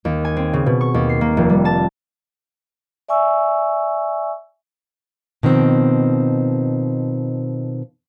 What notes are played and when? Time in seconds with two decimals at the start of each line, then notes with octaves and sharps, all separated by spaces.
0.05 D#2
0.25 G#5
0.36 C4
0.53 C#3
0.66 B2
0.81 C#6
0.94 D#2
1.09 C7
1.21 A#3
1.37 F1
1.49 G3
1.65 A5
3.09 D5 E5 G#5 C#6 E6
5.43 B2 D#3 F3 C4